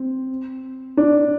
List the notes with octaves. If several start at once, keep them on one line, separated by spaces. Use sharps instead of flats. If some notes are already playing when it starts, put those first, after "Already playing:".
Already playing: C4
D4